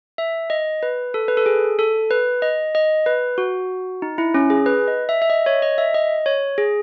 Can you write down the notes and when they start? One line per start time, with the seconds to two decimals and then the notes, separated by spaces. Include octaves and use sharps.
0.18 E5
0.50 D#5
0.83 B4
1.14 A4
1.28 B4
1.37 A4
1.46 G#4
1.79 A4
2.11 B4
2.42 D#5
2.75 D#5
3.06 B4
3.38 F#4
4.02 D#4
4.18 E4
4.34 C#4
4.50 G#4
4.66 B4
4.88 D#5
5.09 E5
5.22 E5
5.30 D#5
5.46 C#5
5.62 D#5
5.78 E5
5.94 D#5
6.26 C#5
6.58 G#4